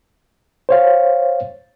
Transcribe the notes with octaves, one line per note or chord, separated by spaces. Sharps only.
C5 C#5 F5